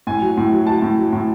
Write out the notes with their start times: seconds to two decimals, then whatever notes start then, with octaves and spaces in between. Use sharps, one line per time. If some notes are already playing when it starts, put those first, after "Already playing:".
0.07 A2 G#5
0.21 F#3
0.37 A2
0.52 F#3
0.67 F#3 A5
0.82 A2
0.98 F#3
1.13 A2